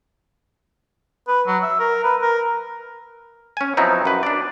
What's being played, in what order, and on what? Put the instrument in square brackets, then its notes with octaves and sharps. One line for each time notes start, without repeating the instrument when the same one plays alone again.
[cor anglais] B4
F#3
E5
A#4
B4
A#4
[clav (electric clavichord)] C#4 G#5
F3 F#3 B3 C4 D#4 E4
F#2 B4
D4 D5